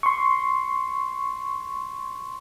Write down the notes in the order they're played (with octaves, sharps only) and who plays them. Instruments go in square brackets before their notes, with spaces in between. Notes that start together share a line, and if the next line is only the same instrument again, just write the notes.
[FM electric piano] C6 C#6